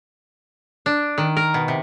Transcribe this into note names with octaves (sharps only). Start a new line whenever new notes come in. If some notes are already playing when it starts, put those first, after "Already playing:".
D4
D#3
A#4
B2
C3